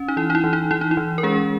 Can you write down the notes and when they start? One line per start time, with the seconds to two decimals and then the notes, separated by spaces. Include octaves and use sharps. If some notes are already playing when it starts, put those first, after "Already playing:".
Already playing: C#4
0.08 D#4
0.17 E3 E4
0.30 D#4
0.35 E4
0.44 E3
0.53 D#4
0.71 E3 E4
0.81 D#4
0.91 E4
0.97 E3
1.18 A#4
1.23 G#3 C#4 G#4